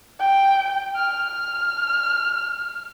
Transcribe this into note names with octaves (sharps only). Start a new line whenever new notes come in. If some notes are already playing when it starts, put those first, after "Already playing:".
G5
F6
F6